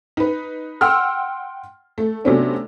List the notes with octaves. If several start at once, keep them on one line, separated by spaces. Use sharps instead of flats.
D#4 B4
F#5 G5 C6 E6 F6
A3
C3 F#3 A3 B3 C#4 D4